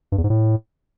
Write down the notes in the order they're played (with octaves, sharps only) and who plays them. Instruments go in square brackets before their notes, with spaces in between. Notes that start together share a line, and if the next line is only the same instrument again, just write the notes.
[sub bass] G2
E2
G#2
A2